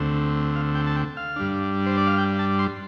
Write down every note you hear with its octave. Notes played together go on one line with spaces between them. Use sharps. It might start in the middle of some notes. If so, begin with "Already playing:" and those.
Already playing: D2 D3 A3 C4
F5
G5
A5
G5
F5
G2 G3 D4
C5
D5
F5
G5
A5
C6